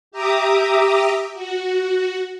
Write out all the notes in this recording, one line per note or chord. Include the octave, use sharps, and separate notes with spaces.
G4 E5 A#5 D6 D#6
F#4